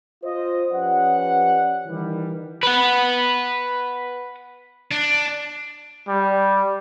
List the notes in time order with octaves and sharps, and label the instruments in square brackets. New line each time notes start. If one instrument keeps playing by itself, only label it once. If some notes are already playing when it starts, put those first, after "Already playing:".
[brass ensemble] F4 C5 D#5
F3 C#4 G4 B4 D5 F#5
D#3 E3 G3
[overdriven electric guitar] B4 F#5
[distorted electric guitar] D4
[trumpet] G3